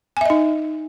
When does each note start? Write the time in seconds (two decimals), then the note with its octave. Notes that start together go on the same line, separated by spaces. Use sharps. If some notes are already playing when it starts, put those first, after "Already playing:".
0.17 G#5
0.21 E5
0.26 D#5
0.30 D#4